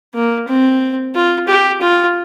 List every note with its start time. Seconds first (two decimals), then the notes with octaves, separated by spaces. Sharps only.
0.14 A#3
0.47 C4
1.15 F4
1.48 G4
1.81 F4